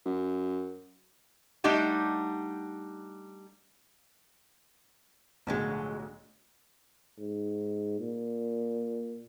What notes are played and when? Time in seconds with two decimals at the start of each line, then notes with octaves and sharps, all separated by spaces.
0.06 F#2
1.64 G3 A3 D4 D#4 G4 F#5
5.47 B1 A2 D3 F3 F#3 G#3
7.19 G#2
8.00 A#2